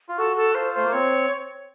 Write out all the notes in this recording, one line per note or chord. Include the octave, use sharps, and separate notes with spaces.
F4
F#4 A4
A4
F4 C5
A3 C5
A#3
C4 C#5